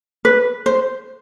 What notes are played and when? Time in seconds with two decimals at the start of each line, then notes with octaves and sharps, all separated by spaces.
0.25 B4
0.66 C5